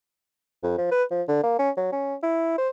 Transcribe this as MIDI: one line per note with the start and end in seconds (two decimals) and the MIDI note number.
0.63 0.74 41
0.78 0.87 53
0.91 1.04 71
1.11 1.22 53
1.28 1.42 50
1.43 1.59 58
1.59 1.70 61
1.77 1.90 54
1.92 2.15 61
2.23 2.54 64
2.58 2.69 72